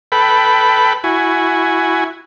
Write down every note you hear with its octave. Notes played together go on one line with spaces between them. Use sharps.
A4 B4 G5 B5
E4 F#4 G#5